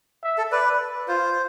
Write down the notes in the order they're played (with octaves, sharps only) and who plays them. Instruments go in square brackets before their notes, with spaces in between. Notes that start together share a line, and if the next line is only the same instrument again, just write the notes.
[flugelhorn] E5
[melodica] A4
[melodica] B4 [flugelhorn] D5
[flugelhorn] F4 [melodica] C5